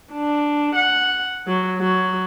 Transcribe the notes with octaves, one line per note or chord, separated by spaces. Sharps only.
D4
F#5
F#3
F#3